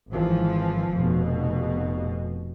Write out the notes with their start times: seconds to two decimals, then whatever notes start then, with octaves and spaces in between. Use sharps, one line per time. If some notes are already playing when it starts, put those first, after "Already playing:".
0.11 G#1 E3 F3
0.94 F1 B2